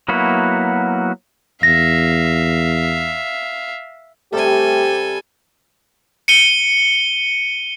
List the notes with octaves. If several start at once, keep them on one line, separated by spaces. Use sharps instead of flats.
F#3 A#3 B3 E4 F#4
E2 E5 F5 A#6
C3 G3 A3 G4 A4 G#5
C#7 D#7 G7